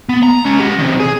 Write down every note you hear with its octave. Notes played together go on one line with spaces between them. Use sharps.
B3
A#5
G#3 C#4
G4 F#5
C3 D#3
G#4